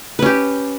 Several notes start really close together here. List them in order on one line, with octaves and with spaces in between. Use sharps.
B4 C#4 G4